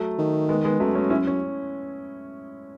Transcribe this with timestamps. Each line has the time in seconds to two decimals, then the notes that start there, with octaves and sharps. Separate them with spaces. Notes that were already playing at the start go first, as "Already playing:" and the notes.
Already playing: F#3 A3
0.18 D#3
0.49 G#3 B3
0.64 G#3 B3
0.80 F#2 F#3 A3
0.95 A3 C#4
1.10 C#4 E4
1.27 C#4